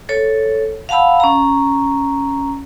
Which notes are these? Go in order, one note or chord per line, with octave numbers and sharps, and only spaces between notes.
A4 C#5
F5 F#5 A5 B5 E6
C#4 A#5